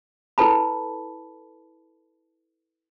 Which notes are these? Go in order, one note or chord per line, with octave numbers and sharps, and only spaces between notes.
E4 A4 B4 A5 B5